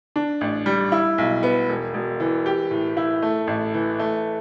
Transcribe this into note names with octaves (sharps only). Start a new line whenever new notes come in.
D4
A1
G3
E4
B1
B3
E1
E1
E3
G4
A2
E4
A3
A1
E3
A3